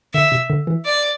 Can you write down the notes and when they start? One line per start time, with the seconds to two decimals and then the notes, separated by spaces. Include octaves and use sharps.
0.13 D3 E5
0.32 C3
0.50 D3
0.67 E3
0.85 D5